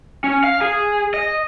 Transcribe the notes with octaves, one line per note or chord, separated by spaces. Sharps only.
C#4
F5
G#4
D#5